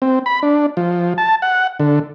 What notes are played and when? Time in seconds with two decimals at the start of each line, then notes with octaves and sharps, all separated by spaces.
0.02 C4
0.26 B5
0.43 D4
0.77 F3
1.18 A5
1.42 F#5
1.80 D3